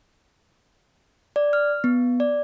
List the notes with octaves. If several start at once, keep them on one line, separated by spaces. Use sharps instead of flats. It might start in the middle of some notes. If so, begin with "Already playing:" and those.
D5
F6
B3
D5